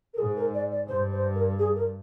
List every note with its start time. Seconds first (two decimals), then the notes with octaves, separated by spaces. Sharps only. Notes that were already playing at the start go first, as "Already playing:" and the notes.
0.13 A#4
0.18 G#2 G#4
0.36 A#4
0.53 D5
0.71 D5
0.88 G2 C5
1.12 C5
1.35 A#4
1.58 G#4
1.75 A#4